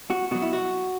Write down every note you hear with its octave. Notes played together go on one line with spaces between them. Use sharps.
F#4
B2 F#3 F#4
E4
F#4